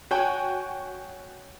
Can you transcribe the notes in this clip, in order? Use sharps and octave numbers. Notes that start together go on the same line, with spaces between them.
F#4 C#5 G5 G#5